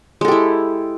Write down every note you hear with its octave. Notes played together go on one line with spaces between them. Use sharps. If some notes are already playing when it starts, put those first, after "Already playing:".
G#3 E4 G4 A4